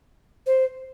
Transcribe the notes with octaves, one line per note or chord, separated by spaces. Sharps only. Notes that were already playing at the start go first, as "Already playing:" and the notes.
C5